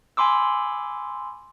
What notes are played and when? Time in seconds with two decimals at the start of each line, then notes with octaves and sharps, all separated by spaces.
0.17 G#5 B5 C6 D6 E6